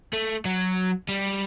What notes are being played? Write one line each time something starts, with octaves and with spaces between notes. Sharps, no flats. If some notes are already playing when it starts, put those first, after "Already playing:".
A3
F#3
G3